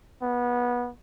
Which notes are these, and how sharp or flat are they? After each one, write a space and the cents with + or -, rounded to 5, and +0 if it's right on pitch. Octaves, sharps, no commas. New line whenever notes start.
B3 -20